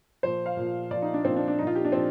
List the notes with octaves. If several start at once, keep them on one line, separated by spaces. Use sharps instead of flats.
A#2 F3 C5
F5
A#2 F3
A#2 F3 D5
D#4
D4
A#2 F3 C4
D4
D4
A#2 F3 D#4
F4
G4
D4
A#2 F3 C4